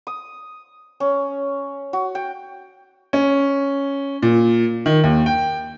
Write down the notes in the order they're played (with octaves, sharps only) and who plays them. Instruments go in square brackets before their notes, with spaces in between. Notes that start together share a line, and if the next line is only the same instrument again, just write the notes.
[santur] D#6
C#4
F#4
G5
[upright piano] C#4
A#2
D#3
D#2
G5